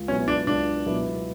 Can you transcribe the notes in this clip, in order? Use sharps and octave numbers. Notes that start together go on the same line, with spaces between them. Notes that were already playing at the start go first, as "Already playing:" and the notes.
Already playing: C#2
B2 F#3 B3 C#4 E4
D4
C#2 D4
B2 F#3 B3 E4